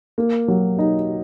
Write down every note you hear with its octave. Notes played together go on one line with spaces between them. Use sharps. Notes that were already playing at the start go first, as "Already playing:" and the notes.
A#3
F#3
D#4